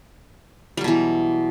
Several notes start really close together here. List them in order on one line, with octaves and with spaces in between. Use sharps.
G3 F#3 B2 E3